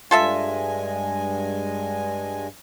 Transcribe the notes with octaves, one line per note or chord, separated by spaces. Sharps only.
G2 G#3 F4 A4 E5 G#5